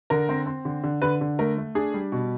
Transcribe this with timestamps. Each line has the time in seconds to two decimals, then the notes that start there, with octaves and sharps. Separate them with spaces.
0.10 D3 A#4
0.29 C4
0.46 C4
0.65 D3
0.83 D3
1.02 D3 B4
1.21 D3
1.39 A3 A#4
1.58 A3
1.75 D4 G#4
1.94 G3
2.12 B2